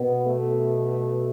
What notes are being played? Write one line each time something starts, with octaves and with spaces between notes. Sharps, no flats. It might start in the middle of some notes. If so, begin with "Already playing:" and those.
Already playing: B2 B3
A3